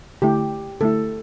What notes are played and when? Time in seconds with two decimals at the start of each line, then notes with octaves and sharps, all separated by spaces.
0.22 D3 A3 E4 G4
0.81 D3 A3 E4 A4